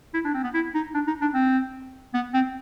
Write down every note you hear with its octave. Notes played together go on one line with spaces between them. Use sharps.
E4
D4
C4
B3
E4
D#4
D4
D#4
D4
C4
B3
C4